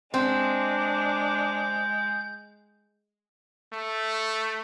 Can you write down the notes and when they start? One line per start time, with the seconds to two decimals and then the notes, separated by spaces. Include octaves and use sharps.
0.14 G#3 C4 D4 G6
3.73 A3